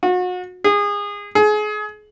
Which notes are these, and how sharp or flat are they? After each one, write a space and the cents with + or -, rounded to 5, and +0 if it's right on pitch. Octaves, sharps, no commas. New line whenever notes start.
F#4 -35
G#4 -25
G#4 +30